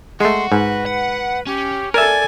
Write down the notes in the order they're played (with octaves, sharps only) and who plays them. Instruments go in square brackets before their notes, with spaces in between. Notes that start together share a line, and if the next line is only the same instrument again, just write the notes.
[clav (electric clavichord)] G#3 A3 [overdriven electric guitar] F#4 [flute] C6
[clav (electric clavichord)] G#2 [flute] B4
[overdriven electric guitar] F#5
[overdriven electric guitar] C#4 [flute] G4
[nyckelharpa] A4 G#5 [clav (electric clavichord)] A#4 E5 [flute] D5